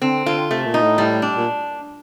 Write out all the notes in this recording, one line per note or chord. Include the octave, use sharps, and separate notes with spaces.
D3 C4
D3 F4
C3 A3
A#2
D#4
A2
A2 G3
D4
A#2